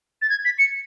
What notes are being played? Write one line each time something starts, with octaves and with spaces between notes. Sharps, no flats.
A6
G#6
B6
C#7